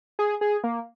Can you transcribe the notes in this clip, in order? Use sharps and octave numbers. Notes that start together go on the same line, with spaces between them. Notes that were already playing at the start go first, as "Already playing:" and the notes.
G#4
G#4
A#3